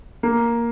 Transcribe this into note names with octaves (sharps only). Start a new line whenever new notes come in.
A#3